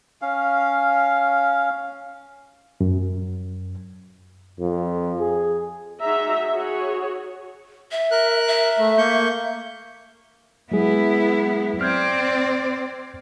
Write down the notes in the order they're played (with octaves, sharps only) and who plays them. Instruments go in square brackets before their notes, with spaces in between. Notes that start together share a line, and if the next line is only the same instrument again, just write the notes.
[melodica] C#4 F5
[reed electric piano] F#2
[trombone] F2
G#4
[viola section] D#4 F#4 G#4 E5 A#5
F#4 G#4 C#5
[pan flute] E5
[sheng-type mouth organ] A#4 F#6
[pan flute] E5
[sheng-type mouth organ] A3
A#3 C#6 G6
[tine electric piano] F#3 G#3 G#4 [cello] B3 E4
[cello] C4 D5 [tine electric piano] F6 G6 G#6